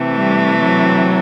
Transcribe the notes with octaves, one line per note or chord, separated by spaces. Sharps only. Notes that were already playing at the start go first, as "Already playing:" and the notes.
Already playing: C3 E3 A3
G3
F#3